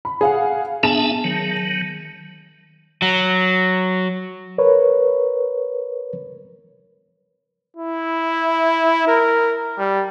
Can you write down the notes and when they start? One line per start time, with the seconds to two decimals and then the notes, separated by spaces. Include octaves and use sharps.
0.05 B5
0.21 G#4 F5 F#5
0.83 B3 D4 G#4 E5 A5 E7
1.24 D#3 F#3
3.02 F#3
4.58 A#4 B4 C#5
7.77 E4
9.08 A#4
9.78 G3